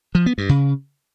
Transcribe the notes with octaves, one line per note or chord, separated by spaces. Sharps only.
F3
B3
G2
C#3